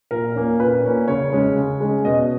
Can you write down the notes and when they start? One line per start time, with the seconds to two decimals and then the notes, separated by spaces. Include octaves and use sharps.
0.11 A#2 A#4
0.35 A#3 C#4
0.60 A#2 B4
0.84 A#3 C#4
1.08 C#3 C#5
1.32 G#3 C#4
1.56 C#3
1.80 G#3 C#4
2.05 B2 D#5